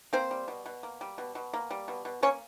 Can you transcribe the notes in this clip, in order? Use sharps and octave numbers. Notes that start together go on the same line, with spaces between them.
A#3 C4 C5
G3
B2
B2
A#3
G3
B2
B2
A#3
G3
B2
B2
A#3 C#4 C#5